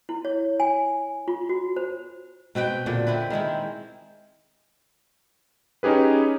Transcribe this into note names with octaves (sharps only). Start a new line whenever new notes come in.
E4
C#5
G#5
F4
F#4
C5
B2 C4 B4 G5
A#2 D3
C4 E4 B4
D#3 G#3 C4 E4
C#4 D#4 G4 G#4 B4